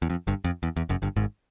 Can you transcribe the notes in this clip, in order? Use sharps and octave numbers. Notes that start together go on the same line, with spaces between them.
E2
F2
G1 G2
F2
E2
E2
F#1 F#2
G1 G2
G#1 G#2